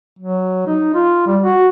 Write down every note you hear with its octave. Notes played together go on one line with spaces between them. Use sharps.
F#3
D#4
F4
G3
F#4